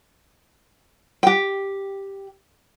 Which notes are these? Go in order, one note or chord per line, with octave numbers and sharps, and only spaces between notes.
G4 G5